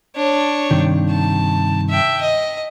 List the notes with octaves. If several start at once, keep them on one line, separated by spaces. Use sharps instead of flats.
D4 C#5
G2 C3 D#3
A5
E5 G5
D#5